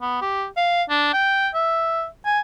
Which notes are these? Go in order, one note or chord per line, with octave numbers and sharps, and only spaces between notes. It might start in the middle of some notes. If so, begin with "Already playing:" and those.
B3
G4
F5
D4
G5
E5
G#5